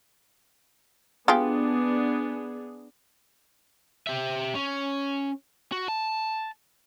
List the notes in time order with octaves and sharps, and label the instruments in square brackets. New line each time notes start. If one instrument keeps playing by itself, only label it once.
[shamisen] G#3 F4 G4 [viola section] B3 D4 G#4
[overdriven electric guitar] G4 E5
C#4
F#4
A5